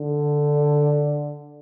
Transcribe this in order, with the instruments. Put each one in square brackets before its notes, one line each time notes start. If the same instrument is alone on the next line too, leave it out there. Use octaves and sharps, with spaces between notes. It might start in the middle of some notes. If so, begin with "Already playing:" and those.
Already playing: [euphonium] D3